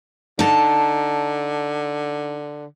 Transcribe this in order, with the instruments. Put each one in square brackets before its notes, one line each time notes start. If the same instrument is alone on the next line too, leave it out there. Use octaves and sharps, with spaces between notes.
[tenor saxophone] D3 [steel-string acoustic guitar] D#4 A5